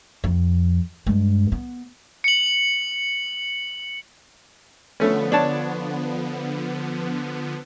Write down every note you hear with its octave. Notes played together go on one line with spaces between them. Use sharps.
F2
G2 G#3
B3
C#7 F#7
D3 F3 A3 B3 C#4
D4 C#5 A5